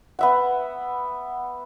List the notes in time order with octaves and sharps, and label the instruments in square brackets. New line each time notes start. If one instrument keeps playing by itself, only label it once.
[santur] B3 E5 F#5